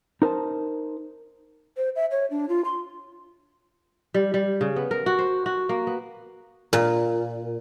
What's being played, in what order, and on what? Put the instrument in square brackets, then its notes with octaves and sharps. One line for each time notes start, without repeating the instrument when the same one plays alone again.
[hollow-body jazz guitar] D#4 A#4 C5 A5
[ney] C5
E5
C#5
D4
F4
C6
[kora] G3
G3
C#3
B3
A#4
F#4
C5
F#4
A#3
B3
[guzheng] A#2